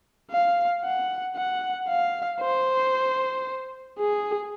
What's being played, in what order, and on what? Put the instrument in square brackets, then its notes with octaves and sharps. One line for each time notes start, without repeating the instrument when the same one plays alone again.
[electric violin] F5
F#5
F#5
F5
C5
G#4